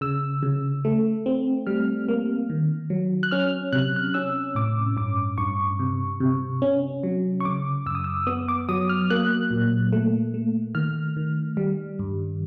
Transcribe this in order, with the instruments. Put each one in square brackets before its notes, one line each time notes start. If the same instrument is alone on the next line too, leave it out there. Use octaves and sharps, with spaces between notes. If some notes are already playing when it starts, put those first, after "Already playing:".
[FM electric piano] C#3 E6
C#3
A3
C4
G3 F6
A#3
D#3
F#3
F#6
C#4 F6
C3 F#6
F#6
C#4 E6
A2 D6
G2 D6
G2 C#6
C3
C3
C#4
F#3
C#6
C#3 D6
F#2 E6
D#6
E6
B3 D#6
D6
F#3 D#6
F6
A#3 F#6
A#2
A3
A3
D#3 F6
D#3
G3
G2